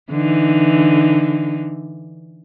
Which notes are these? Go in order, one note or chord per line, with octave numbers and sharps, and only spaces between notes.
D3 E3 D#4